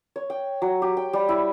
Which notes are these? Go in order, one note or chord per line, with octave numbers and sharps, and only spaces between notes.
C#5
G5
F#3
G4
G5
G3
E4